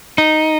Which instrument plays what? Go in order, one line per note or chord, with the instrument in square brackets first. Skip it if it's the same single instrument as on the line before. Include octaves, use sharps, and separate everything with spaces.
[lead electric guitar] D#4